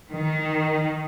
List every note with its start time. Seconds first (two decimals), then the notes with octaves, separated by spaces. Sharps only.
0.11 D#3